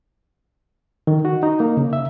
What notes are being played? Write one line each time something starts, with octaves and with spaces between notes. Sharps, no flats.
D#3
F#4
D#4
A#3
C#3
E5